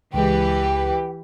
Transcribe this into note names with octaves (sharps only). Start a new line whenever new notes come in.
C#2 E3 G#3 G4 B4 G5